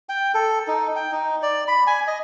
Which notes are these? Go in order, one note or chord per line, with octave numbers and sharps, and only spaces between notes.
G5
A4
D#4
G5
D#4
D5
B5
G#5
D#5